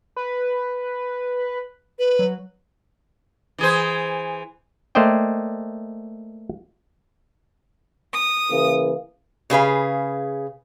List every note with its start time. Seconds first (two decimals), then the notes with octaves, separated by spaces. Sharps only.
0.16 B4
1.99 B4
2.19 F#3
3.58 E3 G#4 C5
4.95 A3 A#3 C5 D5 D#5 G5
8.12 D#6
8.51 C#3 E3 A#3
9.50 C#3 G#4 B4 F5